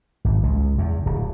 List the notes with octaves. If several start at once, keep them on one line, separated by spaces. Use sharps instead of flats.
G#1
C#2
E2
D1